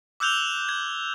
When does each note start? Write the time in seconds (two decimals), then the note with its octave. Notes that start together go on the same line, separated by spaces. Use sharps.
0.20 D6 E6 F#6 G6 F7 G7
0.69 G#6